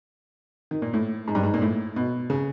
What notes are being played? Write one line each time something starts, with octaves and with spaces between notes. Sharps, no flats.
D#3
A#2
A2
G#2
G2
G#2
A#2
A2
B2
C#3